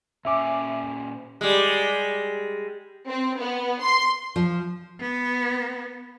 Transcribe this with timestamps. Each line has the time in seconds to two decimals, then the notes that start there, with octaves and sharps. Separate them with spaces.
0.25 A#2 C#4 E5 G#5 D6
1.41 G3 G#3
3.08 C4
3.39 B3
3.82 C6
4.36 F3
5.00 B3